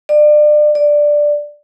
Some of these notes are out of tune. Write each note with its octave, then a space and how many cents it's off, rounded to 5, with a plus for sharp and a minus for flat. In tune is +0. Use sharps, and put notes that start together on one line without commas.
D5 +30
D5 +5